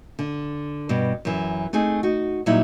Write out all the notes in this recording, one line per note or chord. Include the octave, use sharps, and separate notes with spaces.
D3
G2 B2
F#2 E3
A3 C4 D#4 G#4
D#4 F#4
A#2 F#3 G3 D#4 E4